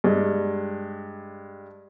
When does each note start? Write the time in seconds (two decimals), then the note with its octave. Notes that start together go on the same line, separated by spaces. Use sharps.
0.04 G2 G#3